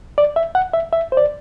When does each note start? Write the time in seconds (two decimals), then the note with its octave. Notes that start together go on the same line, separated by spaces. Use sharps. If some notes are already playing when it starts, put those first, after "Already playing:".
0.18 D5
0.36 E5
0.55 F#5
0.74 E5
0.93 E5
1.12 C5
1.17 D5